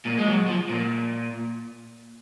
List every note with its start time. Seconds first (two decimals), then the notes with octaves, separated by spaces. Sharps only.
0.06 A#2
0.18 G#3
0.27 F#3
0.48 F3
0.70 A#2